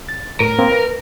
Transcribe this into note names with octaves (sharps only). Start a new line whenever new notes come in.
A6
A2 A#4
A#3 C4
B4